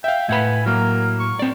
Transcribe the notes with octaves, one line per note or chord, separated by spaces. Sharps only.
E5 F5 G5
A2 B4 E5 F#5 G#5 B5
F#3 A#3 A#4
C#6
C4 D5